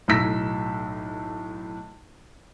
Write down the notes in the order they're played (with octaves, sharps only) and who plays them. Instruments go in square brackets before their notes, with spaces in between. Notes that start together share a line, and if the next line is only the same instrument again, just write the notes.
[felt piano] B1 A2 A#5 E6 B6